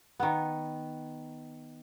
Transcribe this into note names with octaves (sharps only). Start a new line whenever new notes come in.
D#3 B3